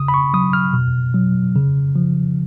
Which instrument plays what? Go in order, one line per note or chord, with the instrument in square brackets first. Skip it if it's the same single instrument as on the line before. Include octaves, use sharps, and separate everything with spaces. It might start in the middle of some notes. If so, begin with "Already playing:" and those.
Already playing: [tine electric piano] C#3 D#6
B5
C#6
F#3 D#6
F6
B2
F#3
C#3
F3